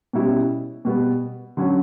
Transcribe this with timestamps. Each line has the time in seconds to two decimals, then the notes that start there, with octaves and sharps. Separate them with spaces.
0.13 B2 G3 C#4 E4
0.85 B2 G3 B3
1.57 D3 F#3 C#4 F#4